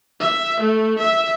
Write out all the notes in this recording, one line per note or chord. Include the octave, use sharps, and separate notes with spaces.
E5
A3
E5